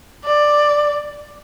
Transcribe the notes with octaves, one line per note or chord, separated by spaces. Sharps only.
D5